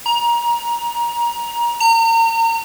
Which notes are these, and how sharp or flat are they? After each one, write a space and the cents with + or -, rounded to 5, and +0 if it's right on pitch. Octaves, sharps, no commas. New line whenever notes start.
A#5 +25
A#5 -35